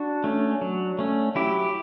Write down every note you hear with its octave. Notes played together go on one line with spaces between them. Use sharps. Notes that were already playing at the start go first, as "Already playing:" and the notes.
Already playing: D4 F#4
A3 C#4
F#3
A3 C#4
F#3 E4 G4